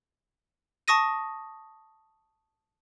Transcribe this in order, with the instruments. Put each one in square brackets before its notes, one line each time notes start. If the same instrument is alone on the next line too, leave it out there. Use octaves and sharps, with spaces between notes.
[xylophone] A5 C#6 D#6 A#6 D#7